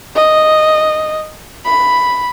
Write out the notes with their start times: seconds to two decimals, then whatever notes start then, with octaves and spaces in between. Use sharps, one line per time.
0.15 D#5
1.66 B5